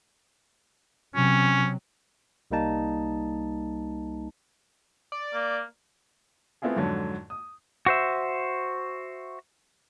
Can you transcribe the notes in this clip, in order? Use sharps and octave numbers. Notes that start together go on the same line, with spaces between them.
C3 F#3 C#4
C2 G3 A#3 D#4 A5
D5
A#3
A3 B3 C4 E4 F4 G#4
F2 G#2 D3 F#3
D#6
F#4 C5 E5